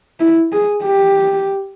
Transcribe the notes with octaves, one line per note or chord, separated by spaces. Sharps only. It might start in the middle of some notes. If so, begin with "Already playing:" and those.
E4
G#4
G4